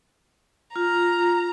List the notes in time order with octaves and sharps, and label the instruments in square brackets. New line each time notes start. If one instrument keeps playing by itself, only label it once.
[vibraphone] F4 [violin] A#5